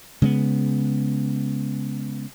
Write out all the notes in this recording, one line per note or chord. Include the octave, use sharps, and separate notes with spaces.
C#3 G#3 A3 B3